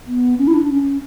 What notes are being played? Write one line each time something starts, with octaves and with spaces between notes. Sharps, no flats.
B3
C#4
E4
D4
C#4